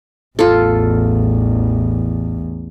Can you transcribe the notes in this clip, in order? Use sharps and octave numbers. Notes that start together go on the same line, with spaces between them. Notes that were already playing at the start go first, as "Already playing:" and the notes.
A1 E2 F4 A4